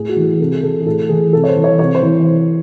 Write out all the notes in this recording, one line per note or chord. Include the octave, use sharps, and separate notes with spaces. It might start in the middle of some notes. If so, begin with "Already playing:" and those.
Already playing: A2 G#4
F#4
E3
G#4
C3 A4
G#4
E3 A4
G#4
A2 A4
E3 G#4
C3 A4
C#5
C5
E3
C#5
C3 C#5
C5
E3